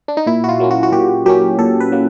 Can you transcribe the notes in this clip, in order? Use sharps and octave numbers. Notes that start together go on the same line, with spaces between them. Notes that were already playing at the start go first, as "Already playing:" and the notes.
D4
D#4
A#2 E4
F#4
F4
F#3 A#3 C#4
F#4
F#4
A#2 G4
F#3 A#3 C#4 G4
A#2 A4
B4
F#3 A#3